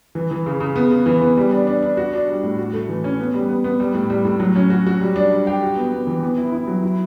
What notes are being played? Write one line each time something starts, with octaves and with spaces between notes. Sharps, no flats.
E3
E3
C#3
C#3
B3
C#3
E3
B3
G3
D4
D4
D4
F#4
D4
G3
A2
F#4
A3
E3
C#4
B3
G3
B3
B3
G3
A2
G3
A2
F#3
C#4
F#4
F#4
G3
D4
G3
G4
F#4
B3
B3
E3
B3
E4
E4
F#3
E4